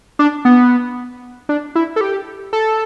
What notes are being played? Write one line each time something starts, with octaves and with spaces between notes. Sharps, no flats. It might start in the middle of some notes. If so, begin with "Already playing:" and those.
D4
B3
D4
E4
A4
G4
A4